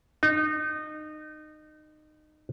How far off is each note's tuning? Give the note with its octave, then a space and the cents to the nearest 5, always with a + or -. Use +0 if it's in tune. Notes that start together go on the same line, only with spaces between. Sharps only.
D#4 -25